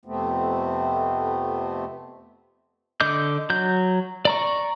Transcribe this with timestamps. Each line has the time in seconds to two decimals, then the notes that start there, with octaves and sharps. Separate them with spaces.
0.05 F2 C3 A3 B3 C4
3.00 D3 D#5 D6 G6
3.50 F#3 G6
4.25 D5 A#5 C#6